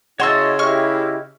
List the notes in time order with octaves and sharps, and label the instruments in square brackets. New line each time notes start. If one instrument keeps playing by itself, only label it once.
[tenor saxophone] C#3 [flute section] E4 D#5 [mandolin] F#4 A5 [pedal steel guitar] C#5 C6 E6
[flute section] E4 G4 D#5 [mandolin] C#6 F6